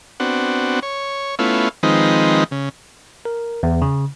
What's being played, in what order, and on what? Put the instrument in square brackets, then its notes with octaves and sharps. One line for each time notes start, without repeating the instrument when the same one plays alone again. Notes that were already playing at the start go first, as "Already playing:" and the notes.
[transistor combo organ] B3 C4 D4 F#4
C#5
A3 B3 C#4 E4 F4
D#3 F3 G#3 C4 D#4 B4
C#3
[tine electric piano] A#4
E2
C#3